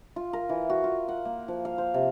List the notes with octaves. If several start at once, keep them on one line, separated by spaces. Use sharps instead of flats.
F4
A#4
E3
F#4
F4
F#5
A#3
F3
F5
C5
C3